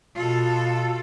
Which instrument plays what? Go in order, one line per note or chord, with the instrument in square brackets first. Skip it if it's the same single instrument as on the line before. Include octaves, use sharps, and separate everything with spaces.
[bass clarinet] B2 [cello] F4 A4